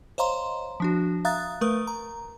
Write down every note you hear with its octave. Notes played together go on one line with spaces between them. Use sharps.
C5 C#5 D#5 F5 A#5 C6
F3 D4 F#4
E5 F5 A#5 D#6 F#6 A6
A3 A#4 B4 D#6
A#5